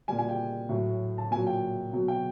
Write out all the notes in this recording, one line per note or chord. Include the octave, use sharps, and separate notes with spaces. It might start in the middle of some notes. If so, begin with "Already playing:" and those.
A#2 G3 G#5
G#5
G5
A2 F#3
A5
A#2 F#3 G#5
G5
B2 F#3
G5